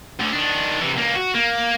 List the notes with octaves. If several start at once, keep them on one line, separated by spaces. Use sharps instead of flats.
D2 D3
D#3 D4
C3 E3
C#2 A#3
F#4
A#3